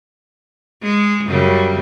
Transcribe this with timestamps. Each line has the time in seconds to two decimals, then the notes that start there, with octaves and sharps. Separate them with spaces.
0.83 G#3
1.27 F#2 C#3 G3